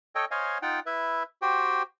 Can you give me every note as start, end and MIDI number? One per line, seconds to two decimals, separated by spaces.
0.15 0.25 69
0.15 0.25 73
0.15 0.25 75
0.15 0.25 79
0.31 0.58 72
0.31 0.58 73
0.31 0.58 75
0.31 0.58 77
0.31 0.58 80
0.62 0.80 63
0.62 0.80 65
0.62 0.80 78
0.62 0.80 79
0.86 1.23 64
0.86 1.23 71
0.86 1.23 76
1.42 1.83 66
1.42 1.83 67
1.42 1.83 72
1.42 1.83 79